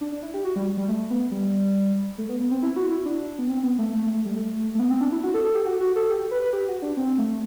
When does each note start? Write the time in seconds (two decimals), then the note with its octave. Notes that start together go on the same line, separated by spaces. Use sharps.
0.01 D4
0.12 D4
0.23 E4
0.34 G4
0.45 F#4
0.56 G3
0.77 G3
0.88 A3
1.10 B3
1.31 G3
2.18 A3
2.29 B3
2.40 B3
2.51 C4
2.63 E4
2.76 F#4
2.91 E4
3.05 D4
3.39 B3
3.49 C4
3.63 B3
3.78 A3
3.92 A3
4.04 A3
4.14 A3
4.25 G3
4.36 A3
4.75 A3
4.80 B3
4.90 C4
5.01 D4
5.12 E4
5.23 F#4
5.34 A4
5.44 A4
5.55 G4
5.66 F#4
5.81 F#4
5.96 A4
6.10 G4
6.31 B4
6.42 B4
6.53 G4
6.68 F#4
6.82 D4
6.97 C4
7.18 A3